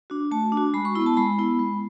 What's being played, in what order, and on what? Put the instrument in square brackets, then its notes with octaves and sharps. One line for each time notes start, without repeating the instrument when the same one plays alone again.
[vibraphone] D4 F#4
A3 A5
D4
F#4
G#3 B5
C#6
B3 E4 B5
A5
G#3 B5
B3 E4
G#3